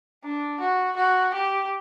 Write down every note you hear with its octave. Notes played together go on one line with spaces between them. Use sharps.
D4
F#4
F#4
G4